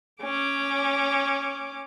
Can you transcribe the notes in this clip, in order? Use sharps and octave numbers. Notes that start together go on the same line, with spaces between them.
C#4 D6